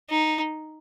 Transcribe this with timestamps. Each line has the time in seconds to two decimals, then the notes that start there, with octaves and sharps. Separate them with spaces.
0.09 D#4